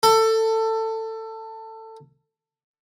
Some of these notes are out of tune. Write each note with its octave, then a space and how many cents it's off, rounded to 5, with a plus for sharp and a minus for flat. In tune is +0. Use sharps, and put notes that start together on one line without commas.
A4 +20